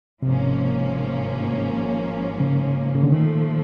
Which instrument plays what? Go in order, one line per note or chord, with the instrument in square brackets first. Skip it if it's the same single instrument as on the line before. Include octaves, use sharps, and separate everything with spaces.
[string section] G#1 G#2 F3 A#3 C#4 [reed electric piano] C3
[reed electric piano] C#3
C#3
D3
[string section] A#2 F3 A3 [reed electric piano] D#3